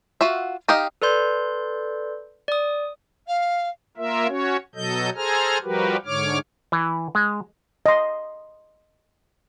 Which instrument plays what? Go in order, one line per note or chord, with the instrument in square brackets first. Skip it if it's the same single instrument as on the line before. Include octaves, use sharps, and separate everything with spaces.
[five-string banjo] F4 F#4 E5
D#4 G4 D#5 F5
[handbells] A4 B4 D5 C6 G6
D5 D#6
[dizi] F5
[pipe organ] A#3 F4 A#4 E5
C#4 F#4 C#5
B2 F#3 A4 D#5 G6
G#4 A4 C5 G#5 A#5 F6
F3 G3 F#4 G4 A#4 B4
G#2 D3 C#5 D6 F6
[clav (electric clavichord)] E3
G#3
[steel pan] D#5 C6